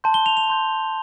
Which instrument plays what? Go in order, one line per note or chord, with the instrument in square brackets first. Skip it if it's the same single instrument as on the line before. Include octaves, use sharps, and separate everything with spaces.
[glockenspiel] A5 C6 G6
G7
F7
F7
A5 C6 G6